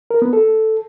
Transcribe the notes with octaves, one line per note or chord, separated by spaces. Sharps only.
A#4
B3
A4